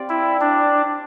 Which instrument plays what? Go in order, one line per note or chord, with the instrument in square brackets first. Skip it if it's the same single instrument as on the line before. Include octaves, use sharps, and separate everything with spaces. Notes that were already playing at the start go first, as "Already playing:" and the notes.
Already playing: [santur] C4 G4 D5 F5
[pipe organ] E4
D4